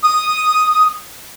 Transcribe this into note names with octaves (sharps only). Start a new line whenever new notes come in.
D#6